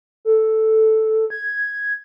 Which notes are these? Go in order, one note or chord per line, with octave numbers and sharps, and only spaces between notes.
A4
G#6